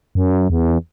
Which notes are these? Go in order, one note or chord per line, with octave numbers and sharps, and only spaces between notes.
F#2
E2